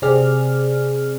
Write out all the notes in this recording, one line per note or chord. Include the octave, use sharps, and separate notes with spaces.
C3 C4 G#4 D5 F6